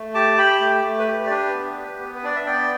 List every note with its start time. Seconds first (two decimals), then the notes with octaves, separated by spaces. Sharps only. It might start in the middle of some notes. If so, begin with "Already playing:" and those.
Already playing: A3
0.14 G4 A5 D6
0.37 G4 G5 B5
0.61 A3
0.84 A3
0.99 B4
1.08 G4
1.26 D5
1.30 D4 B4
1.54 B3
1.77 G4
2.00 B3
2.15 B4
2.23 D4 D5
2.36 E5
2.46 B3 D5 G5